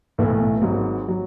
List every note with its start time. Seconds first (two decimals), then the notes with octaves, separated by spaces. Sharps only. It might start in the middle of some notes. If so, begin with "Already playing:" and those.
0.18 B1 A2 E3 A3 E4
0.61 G#1 G#2 F#3
1.08 F#3